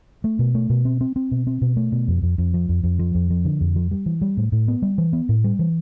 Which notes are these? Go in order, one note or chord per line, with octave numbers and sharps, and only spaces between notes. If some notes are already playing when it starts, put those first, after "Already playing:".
A3
B2
A3
B2
C4
C4
C4
B2
C4
B2
A3
B2
F2
F2
F2
F3
F2
F2
F3
F2
F3
D3
F2
F3
G3
E3
G3
A2
A2
B3
G3
E3
B3
A2
G3
E3